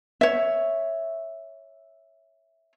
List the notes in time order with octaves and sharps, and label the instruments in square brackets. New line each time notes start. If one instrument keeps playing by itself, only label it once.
[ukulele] C#5 E5